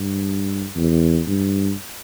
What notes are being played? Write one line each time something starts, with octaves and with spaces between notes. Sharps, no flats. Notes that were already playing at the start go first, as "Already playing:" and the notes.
Already playing: G2
E2
G2